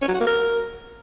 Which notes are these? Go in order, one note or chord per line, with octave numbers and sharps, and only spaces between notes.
C#4
F#3
F#4
A#3
A#4